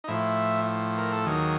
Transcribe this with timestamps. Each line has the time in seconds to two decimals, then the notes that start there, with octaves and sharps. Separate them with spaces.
0.04 D#4
0.08 A2 F3 E4
0.98 A#4
1.12 A4
1.26 D#2 D#3 F#3 G#4